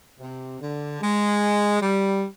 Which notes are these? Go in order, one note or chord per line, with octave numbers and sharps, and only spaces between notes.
C3
D3
G#3
G3